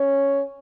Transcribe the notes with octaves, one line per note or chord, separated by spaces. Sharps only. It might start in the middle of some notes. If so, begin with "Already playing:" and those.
Already playing: C#4